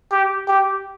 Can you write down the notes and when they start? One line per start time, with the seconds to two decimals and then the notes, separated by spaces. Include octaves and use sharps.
0.12 G4
0.48 G4